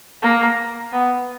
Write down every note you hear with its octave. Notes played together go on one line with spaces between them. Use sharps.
A#3
B3